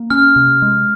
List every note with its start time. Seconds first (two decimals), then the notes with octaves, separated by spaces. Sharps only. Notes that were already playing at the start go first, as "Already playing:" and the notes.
Already playing: A#3
0.10 C#4 F6
0.36 C3
0.62 G#3